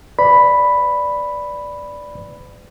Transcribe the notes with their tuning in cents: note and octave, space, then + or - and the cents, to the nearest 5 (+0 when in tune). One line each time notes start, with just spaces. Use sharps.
B4 +40 D5 +0 B5 +0